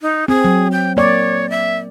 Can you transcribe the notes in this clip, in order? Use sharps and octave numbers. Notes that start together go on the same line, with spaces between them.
D#4
C4 G#4
F#3
G5
A#3 C#5 D5
E5